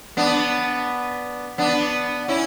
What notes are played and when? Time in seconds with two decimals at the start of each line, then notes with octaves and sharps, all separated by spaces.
0.17 B3 D4
1.58 B3 D4
2.28 C#4 E4